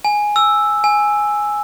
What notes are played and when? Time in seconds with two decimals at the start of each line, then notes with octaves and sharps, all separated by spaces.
0.05 G#5
0.36 E6
0.84 G#5